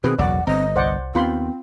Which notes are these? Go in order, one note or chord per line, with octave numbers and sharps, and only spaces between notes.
B2 D#3 C4 G#4 B4
F#1 B1 E2 F#3 D5 F#5
G1 C4 D#5 A#5
C2 C5 D5 F#5
D#2 B3 C4 F4 B5 C6